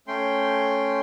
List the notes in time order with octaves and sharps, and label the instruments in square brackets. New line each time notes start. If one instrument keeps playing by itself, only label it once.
[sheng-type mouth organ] A3 C#4 G5 C6